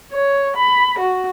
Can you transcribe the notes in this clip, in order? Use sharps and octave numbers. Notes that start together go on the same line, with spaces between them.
C#5
B5
F#4